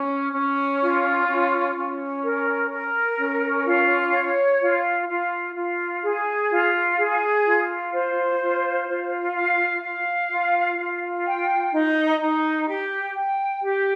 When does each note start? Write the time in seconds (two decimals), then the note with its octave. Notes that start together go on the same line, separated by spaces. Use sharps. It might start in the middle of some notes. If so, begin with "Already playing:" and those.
Already playing: C#4
0.33 C#4
0.80 F4
1.27 C#4
1.75 C#4
2.22 A#4
2.70 A#4
3.18 C#4
3.65 F4
4.12 C#5
4.61 F4
5.08 F4
5.55 F4
6.03 G#4
6.50 F4
6.97 G#4
7.45 F4
7.93 C5
8.40 F4
8.87 F4
9.35 F5
9.82 F5
10.30 F4
10.77 F4
11.25 G5
11.73 D#4
12.20 D#4
12.68 G4
13.15 G5
13.62 G4